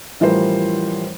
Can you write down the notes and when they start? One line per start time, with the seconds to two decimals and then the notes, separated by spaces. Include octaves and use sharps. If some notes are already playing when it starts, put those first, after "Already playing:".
0.20 A1 E3 F3 G3 A#4 C5